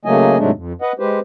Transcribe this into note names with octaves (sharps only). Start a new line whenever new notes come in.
C#3 F#3 A3 A#3 D#5 G#5
G#2 C3 F#3 G#3 A3 D4
F2
B4 D#5 F#5
G#3 G4 B4 C5